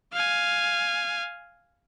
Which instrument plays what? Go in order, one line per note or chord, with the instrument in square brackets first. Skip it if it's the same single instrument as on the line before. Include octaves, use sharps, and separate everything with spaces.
[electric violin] F5 G#5